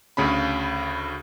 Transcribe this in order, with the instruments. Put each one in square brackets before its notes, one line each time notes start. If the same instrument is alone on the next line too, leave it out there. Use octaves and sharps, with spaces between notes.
[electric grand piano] D2 C#3 C#4 B5